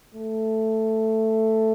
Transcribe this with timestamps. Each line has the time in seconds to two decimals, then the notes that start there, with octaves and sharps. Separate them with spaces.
0.14 A3